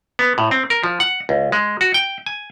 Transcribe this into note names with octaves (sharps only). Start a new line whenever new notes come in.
B3
A2
C4
A#4
F3
F#5
C#2
G#3
F#4
G5
G#5